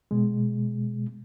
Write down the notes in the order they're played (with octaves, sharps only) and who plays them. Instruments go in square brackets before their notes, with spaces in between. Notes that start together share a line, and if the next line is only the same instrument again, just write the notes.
[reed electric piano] B2 G#3